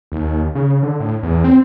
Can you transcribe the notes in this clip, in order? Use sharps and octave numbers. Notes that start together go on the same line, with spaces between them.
D#2
C#3
D3
A2
E2
C4